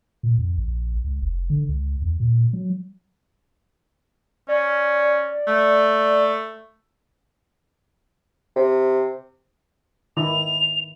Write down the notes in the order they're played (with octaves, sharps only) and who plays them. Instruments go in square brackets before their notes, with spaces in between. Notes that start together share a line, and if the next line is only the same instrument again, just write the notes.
[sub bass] A#2
F2
A#1
C#2
F1
D3
C#2
E2
A#2
F#3
[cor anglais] C#4 [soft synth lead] D5
[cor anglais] A3
[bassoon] C3
[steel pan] D#3 E4 [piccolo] F7